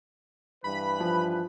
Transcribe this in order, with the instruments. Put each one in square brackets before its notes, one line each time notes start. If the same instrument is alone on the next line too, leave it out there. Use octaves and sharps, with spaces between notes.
[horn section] G2 E3 B4 [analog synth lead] B5
[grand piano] F3